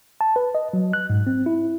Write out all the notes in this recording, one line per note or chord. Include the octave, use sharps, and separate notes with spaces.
A5
B4
D#5
F#3
F#6
G#2
C4
E4